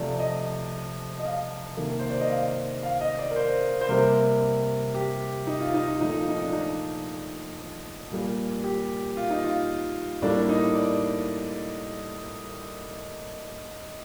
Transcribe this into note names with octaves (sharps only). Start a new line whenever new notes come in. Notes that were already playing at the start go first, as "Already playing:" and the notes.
Already playing: C3 F3 A3 D5
D#5
D#5
F5
C3 D#3 A#3
C5
D5
D#5
F5
F5
D#5
D5
A#4
C5
C5
C3 G3 A#3 A#4
G4
D#4
F4
D#4
F4
A#2 F3 A3 D#4
F4
D#4
D4
D#4
A#2 G3 A#3
G4
F4
D#4
F4
A2 G3 A#3 D4
D#4
D5